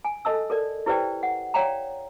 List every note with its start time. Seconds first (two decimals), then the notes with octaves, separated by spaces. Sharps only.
0.05 G#5
0.25 A4 D#5 A5 E6
0.50 A4 A#4 D5
0.86 E4 G4 B4 C5 D5 G5
1.23 F#5
1.54 C#5 D5 F5 G5 A#5